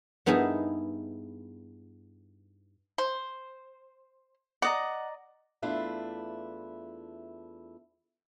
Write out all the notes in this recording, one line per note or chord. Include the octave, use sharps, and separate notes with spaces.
G2 B3 D#4 E4 G#4 D#5
C5
D5 D#5 F#5 A#5
E2 A3 D4 E4 F4 B4